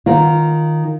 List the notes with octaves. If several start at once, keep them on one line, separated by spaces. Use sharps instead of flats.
D#3 F4